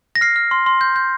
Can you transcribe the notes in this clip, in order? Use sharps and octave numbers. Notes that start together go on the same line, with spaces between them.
A#6
F6 C7
F6
C6
C6
G6
G6